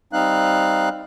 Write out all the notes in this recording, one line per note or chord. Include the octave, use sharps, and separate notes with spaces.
G3 C4 D#4 F5 F#6